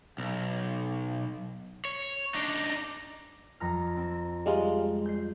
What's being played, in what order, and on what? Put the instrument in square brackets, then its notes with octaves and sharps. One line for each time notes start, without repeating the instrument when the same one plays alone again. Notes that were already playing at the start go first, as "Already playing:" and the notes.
[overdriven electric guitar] B1
C#5
D4 D#4
[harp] F2 A#5 F6
C4
[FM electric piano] G3 G#3 F4
[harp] G6 C7